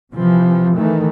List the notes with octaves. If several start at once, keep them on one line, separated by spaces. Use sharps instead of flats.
C3 E3 F3
D#3 E3 A3